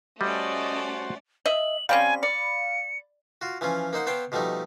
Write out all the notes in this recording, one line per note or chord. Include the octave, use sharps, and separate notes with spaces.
G3 A3 C#4 F#4 C5 D5 D#5
D#5 E5 F#7
G3 C4 C#4 F5 G#5 B5
D5 C#7
F4 F#4
E3 F3 C#4 F4
A#3 D#4 C5 F#5
B3 C5 C#5 F5 G5 A5
B2 F3 G3 A3 D#4